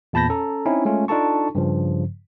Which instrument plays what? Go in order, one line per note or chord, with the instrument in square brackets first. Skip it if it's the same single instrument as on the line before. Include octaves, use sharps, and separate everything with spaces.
[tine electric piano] E2 A#2 A5 B5 G6 A#6
C#4 A4 A#5
C4 C#4 D#4 E4
G#3 A3 C#4 F4
D4 D#4 F4 A4 A5 C#6
G2 C#3 F3